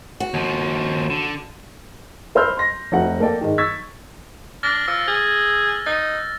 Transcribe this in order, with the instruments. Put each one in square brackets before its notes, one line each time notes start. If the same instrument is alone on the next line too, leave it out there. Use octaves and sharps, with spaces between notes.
[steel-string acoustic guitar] F#4
[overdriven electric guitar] D#2 F3
D3
[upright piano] A#4 C5 B5 E6 F6 G6
C6 A#6
F1 A3 C4 F#4 F#5
A#3 A4 D5 G5
G#2 D#3
C#6 E6 G#6 A6 B6
[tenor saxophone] D4 [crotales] F6 A6 A#6
[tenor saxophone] F3 [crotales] E6
[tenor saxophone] G#4
[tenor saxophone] D#4 [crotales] A6